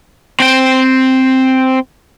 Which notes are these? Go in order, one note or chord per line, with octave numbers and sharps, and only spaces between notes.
C4 G5